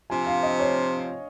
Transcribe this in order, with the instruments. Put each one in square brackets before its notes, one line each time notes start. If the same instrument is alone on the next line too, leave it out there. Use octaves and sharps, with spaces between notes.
[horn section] C3 F3 C4 F4 [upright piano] G#5
[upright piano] F5
D#5
C#5